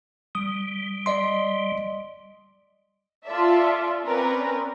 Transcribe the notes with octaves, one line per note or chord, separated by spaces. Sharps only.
G3 D#6
D5 D#5 C6
F4 A4 D5 E5
C4 C#4 A#4 B4 D5